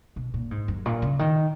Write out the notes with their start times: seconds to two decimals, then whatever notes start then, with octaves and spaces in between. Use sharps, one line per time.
0.16 B2
0.34 A#2
0.51 G#2
0.68 F#2
0.86 A#2
1.02 C#3
1.19 D#3